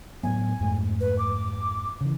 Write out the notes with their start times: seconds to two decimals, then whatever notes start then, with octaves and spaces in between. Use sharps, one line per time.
0.23 A2 F#3 B3 G#5
0.60 F2 G#2 A3
1.00 B4
1.19 D6
2.01 C#3 E3